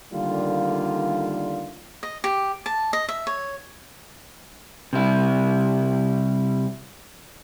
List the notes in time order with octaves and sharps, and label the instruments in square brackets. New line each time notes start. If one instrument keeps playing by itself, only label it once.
[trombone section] D3 D#3 G3 A3 A#3 F4
[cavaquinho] D#5
G4
A5
D#5
E5
C#5
[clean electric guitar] C3 G3 E4